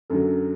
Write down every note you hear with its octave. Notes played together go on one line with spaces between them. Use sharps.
F#2 D3 F#3 A4